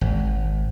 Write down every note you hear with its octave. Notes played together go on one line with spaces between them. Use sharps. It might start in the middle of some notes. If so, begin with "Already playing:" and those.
G#1